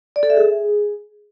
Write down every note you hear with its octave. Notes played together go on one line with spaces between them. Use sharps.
D5
A4
E5
G#4